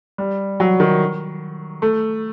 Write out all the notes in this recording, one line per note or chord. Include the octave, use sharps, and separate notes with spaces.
G3
F#3
D#3
A3